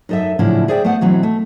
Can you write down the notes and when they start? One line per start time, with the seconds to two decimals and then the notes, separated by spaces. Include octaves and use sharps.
0.09 F#2 D#4 A4 D#5 E5
0.39 A2 C#3 F3 F#3 D4 E4
0.68 G#4 C5 D5 E5 F#5 G5
0.84 A3 B3 C5 F#5
1.01 B2 E3 F#3 C4
1.23 A3